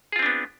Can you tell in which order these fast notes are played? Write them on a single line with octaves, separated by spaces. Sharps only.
G#4 F4 C4 D4 B3